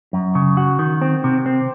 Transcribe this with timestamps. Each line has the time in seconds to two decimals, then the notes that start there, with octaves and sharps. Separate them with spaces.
0.13 F#2
0.35 C#3
0.57 F#4
0.79 D#3
1.02 C4
1.24 C3
1.46 C4